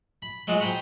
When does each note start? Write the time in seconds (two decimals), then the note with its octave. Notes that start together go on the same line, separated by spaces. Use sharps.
0.22 B5
0.47 F#3 G#3 F4 F#4
0.60 C5 G5 G#5 A#5 B5 C#6